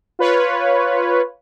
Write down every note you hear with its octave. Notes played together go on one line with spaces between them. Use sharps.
F4 B4 C#5